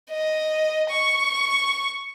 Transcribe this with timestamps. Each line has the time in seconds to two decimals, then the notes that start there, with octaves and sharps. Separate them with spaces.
0.11 D#5
0.90 C#6